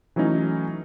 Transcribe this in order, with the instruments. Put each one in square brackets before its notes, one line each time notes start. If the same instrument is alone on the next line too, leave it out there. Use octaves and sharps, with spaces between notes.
[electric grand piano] E3 F#3 A3 C#4 D#4